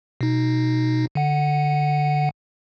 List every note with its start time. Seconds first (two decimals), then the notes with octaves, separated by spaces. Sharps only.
0.21 B2 D#4
1.15 D3 F#5